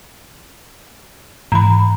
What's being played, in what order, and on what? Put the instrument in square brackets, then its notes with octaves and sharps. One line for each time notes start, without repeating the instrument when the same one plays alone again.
[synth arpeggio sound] G#2 E3 [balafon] A#5 B5